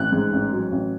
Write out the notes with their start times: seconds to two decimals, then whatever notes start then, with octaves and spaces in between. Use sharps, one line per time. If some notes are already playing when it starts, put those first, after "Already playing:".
Already playing: A1 F#6
0.12 G#2
0.33 A1
0.53 F#3
0.72 A1